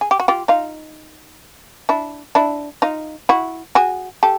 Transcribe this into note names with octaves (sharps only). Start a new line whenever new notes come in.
G#4
G4
F#4
F4 G4
D#4 F4
D4 E4
D4 E4
D#4 F4
E4 F#4
F#4 G#4
G4 A4